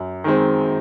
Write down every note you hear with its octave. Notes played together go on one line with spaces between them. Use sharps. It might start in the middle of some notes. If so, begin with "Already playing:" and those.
Already playing: F#2
D#3 G#3 C4